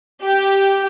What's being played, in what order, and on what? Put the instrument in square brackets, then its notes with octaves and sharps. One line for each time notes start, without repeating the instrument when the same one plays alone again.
[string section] G4